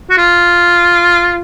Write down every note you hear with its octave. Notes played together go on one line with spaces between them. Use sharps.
F#4
F4